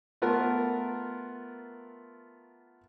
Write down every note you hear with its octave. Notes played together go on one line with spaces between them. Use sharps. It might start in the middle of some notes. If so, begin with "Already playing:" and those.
A3 B3 F4 A#4